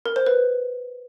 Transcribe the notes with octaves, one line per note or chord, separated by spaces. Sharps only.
A#4
C5
B4